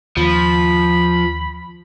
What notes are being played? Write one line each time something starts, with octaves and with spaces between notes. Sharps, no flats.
D#2 F3 B5